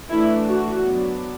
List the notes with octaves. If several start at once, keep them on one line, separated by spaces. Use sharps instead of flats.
E3 A3 D4 E4
F#4
F#3 B3 D4